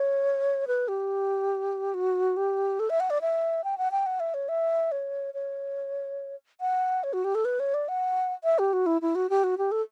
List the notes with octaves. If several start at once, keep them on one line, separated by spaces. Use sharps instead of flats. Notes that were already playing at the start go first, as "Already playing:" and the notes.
Already playing: C#5
B4
G4
F#4
G4
A4
E5
F#5
D5
E5
G5
F#5
G5
F#5
E5
C#5
E5
C#5
C#5
F#5
C#5
F#4
G4
A4
B4
C#5
D5
F#5
E5
G4
F#4
E4
E4
F#4
G4
F#4
G4
A4